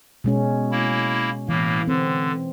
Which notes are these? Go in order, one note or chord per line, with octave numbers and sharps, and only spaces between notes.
B2 G#3 C#4
A#3 E4
A2 E3 A#3
D3 C4